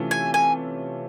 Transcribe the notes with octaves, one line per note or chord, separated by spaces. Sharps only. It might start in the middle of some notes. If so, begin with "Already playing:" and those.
Already playing: C3 E3 A3 C#4 F4
G#5
G#5